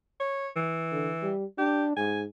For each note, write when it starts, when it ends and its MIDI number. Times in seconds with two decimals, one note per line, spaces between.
0.20 0.48 73
0.56 1.30 52
0.91 1.10 50
1.23 1.45 55
1.58 1.92 62
1.58 1.84 67
1.97 2.25 44
1.97 2.21 80